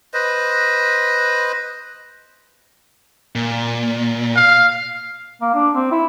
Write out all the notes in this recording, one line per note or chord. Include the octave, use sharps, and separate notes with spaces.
B4 C5 D#5
A#2
F5
A#3
D4
C4
E4